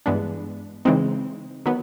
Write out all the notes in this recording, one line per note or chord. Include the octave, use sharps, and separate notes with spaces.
G2 E3 G#3 B3 D4
C#3 E3 G#3 C4 D#4
D#3 F#3 B3